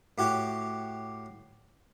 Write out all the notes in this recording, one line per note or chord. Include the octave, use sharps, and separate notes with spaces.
A2 F#4 G4 C#5